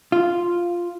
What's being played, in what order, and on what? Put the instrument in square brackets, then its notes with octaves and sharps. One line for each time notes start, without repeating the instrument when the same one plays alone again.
[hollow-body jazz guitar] F4